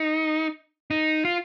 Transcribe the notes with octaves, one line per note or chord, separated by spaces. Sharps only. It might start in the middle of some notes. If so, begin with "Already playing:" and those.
Already playing: D#4
D#4
F4